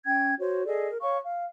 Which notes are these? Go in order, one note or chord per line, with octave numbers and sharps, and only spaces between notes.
C#4 G5 G#6
F#4 C5 C#5
G#4 A4 D5 D#5
A#4
C#5 F5 C#6
F5